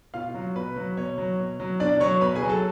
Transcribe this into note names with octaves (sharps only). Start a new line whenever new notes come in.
B2 F4 F5
F#3
B2 B4
F#3
B2 C#5
F#3
B2
F#3
B2 D4 D5
F#3 C#5 C#6
B2 B4 B5
G#4 G#5
F#3
A4 A5